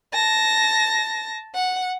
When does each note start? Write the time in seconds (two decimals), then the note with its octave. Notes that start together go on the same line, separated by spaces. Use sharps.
0.14 A5 A#6
1.55 F#5